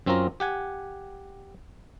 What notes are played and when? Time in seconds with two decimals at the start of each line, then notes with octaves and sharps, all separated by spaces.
0.06 F#2 C4 C#4 F4 A#4 A#5
0.40 G4 F#5 G#5